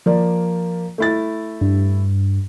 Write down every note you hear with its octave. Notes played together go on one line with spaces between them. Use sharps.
F3 A#3 D5
A3 E4 A6
G2